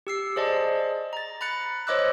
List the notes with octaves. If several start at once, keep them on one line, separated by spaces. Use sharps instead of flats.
G4 E6 C7
G#4 C5 D5 D#5 A5
A#5 A6
A#5 B5 F#6 A6 C#7
C5 C#5 D#5 D6 E6 F#6